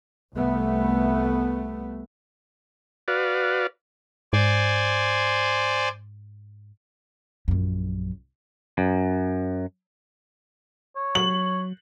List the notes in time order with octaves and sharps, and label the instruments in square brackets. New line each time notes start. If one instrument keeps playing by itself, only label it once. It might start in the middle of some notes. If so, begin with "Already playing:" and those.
[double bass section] C2 A3 B3
[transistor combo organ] F#4 B4 D5 F5
[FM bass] G#2 [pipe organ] C5 D5 G#5
[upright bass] A#1 F#2
[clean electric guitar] F#2
[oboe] C#5
[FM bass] F#3 [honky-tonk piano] F#7